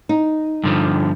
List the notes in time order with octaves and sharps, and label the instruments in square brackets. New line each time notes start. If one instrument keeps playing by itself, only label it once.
[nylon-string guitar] D#4
[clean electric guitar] G2 D3 F3